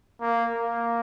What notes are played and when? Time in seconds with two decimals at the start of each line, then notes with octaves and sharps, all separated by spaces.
0.21 A#3
0.56 A#3